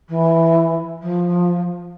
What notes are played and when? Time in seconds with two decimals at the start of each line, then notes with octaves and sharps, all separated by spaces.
0.08 E3
1.01 F3